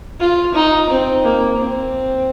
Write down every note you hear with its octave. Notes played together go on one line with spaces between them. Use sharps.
F4
D#4
C4
A#3
C4